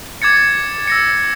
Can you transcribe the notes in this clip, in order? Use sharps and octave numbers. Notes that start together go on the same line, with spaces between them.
D6 G#6 A6 C#7
E6 A#6 C#7